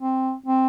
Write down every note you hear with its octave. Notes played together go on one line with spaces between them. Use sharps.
C4
C4